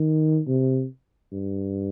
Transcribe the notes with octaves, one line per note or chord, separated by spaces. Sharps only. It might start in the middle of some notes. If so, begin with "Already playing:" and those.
Already playing: D#3
C3
G2